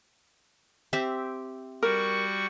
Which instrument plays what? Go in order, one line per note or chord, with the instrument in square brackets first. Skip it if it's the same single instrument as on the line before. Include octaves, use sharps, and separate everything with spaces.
[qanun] C4 G4 E5
[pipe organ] G3 F#4 C#6 [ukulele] A#4